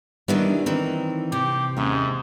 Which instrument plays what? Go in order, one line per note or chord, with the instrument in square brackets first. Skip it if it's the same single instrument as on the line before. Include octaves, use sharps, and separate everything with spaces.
[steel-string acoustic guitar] D#3 E3 D4 [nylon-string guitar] G3 B3 E4
[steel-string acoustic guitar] D#3 E3 [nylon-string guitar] C4
[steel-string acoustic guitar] C3 [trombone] G4
[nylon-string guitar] D#2 C#4 E5 [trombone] G#2